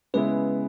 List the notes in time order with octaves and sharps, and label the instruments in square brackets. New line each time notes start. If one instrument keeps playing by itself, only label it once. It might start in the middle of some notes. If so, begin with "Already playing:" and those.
[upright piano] C#3 G#3 B3 E4 [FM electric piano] B4